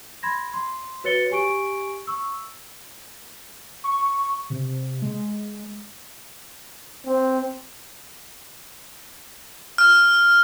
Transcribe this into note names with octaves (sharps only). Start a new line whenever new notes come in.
B5 C6 G#6 A#6
C6
F#4 B4 C#5 A6 C#7 G7
G4 G#5 C#6 D7
C#6 E6
C#6
C3
G#3
C4
F6